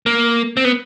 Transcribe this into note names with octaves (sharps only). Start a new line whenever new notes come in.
A#3
C4
B3